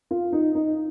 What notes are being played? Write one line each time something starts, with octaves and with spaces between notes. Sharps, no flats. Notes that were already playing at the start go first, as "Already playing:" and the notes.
F4
D#4
D#4